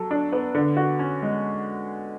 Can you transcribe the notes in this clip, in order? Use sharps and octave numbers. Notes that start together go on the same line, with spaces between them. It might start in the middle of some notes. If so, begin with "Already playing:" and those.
Already playing: F#3 A4
D4
B3
D3
F#4
C#4
G#3